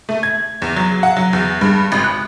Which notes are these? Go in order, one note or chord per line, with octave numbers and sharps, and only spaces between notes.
A3
G#6
E2
F#3
F#5
F#3
E2
G2
G#1
F#6